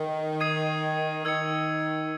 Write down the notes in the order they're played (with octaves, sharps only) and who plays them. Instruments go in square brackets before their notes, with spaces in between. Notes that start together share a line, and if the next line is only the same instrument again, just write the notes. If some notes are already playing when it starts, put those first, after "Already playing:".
Already playing: [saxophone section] D#3
[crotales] D#6 G#6 C7 D#7
[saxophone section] D#3 [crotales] E6 G#6 C#7